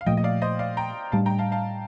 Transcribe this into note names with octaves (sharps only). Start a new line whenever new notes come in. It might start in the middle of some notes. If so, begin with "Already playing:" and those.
F5
A#2 F3 A3 D#5 G5
D#5
D5 F5
C5 D#5
D5 F5
G5 A#5
A2 G3 D4 F5 A5
G5 A#5
F5 A5
F5 A5